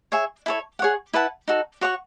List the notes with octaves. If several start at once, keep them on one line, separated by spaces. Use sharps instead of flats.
G#4 C#5 E5 G#5
E4 A4 C#5
G#4 C#5 F#5
E4 B4 F#5 A5
D#4 F#4 A4
F#4 C#5 F#5 C#6